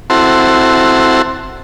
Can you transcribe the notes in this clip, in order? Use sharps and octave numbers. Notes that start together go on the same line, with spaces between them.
C4 E4 F#4 A4 C5